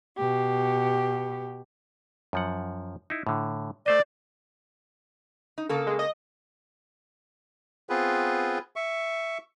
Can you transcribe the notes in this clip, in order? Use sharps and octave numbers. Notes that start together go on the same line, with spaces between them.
B2 G4
F#2 F3 F#5
D#4 E4
A2 D3
A3 C5 D5 D#5
D#4
C#3 A#3 A4
G#3
D#5
B3 C4 F4 G#4 B4
E5 C#6